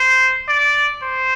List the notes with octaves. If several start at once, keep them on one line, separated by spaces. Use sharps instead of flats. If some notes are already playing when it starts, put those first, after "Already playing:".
Already playing: C5
D5
C5